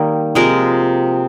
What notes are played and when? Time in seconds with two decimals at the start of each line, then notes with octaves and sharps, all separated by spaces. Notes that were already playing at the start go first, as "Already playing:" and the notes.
Already playing: D#3 G3 A#3
0.35 C3 F3 G#3 A#4